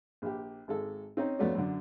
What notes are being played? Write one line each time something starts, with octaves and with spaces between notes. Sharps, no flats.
A#1 G4
G#1 G#3 A4
C4 C#4 D#4
F2 F#3 A3 B3 C#4 D4
F#2 D3